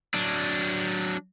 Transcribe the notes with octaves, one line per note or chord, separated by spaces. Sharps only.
F#3 D4